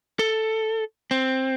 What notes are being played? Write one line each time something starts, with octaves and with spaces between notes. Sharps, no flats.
A4
C4